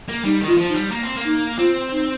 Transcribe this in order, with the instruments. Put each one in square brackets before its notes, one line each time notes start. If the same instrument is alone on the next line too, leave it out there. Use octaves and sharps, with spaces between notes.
[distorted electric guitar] A#3
[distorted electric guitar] G3 [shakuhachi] D#4
[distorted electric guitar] D#3
[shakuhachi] F4
[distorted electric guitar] F3
[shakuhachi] D#4
[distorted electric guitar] G3
A#3
C4
A#3
[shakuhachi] D#4
[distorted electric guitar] C4 [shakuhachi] F4
[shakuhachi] D#4